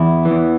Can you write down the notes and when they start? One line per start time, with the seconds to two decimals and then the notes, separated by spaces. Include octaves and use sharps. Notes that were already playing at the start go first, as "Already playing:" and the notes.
Already playing: E2 E4
0.25 E3
0.30 E2